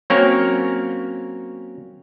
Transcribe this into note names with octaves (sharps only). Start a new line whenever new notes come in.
F#3 A#3 C4 C#4 A#4 C#5